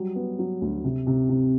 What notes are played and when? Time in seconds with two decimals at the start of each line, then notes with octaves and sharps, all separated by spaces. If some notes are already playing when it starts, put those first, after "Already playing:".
Already playing: F#3 G3
0.16 B3
0.39 F#3
0.62 D2
0.84 C3
1.07 C3
1.29 C3